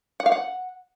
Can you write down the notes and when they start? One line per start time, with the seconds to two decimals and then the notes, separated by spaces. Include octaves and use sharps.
0.20 F#5
0.26 F5
0.32 F#5